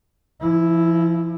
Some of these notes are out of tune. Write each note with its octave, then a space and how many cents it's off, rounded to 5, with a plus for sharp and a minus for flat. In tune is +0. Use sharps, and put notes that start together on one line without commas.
F3 -40 E4 -5